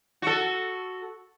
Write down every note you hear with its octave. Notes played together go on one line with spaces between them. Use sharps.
F#4 A4